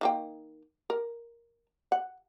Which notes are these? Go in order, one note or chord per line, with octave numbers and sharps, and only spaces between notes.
D#3 A#3 G5
A#4
F#5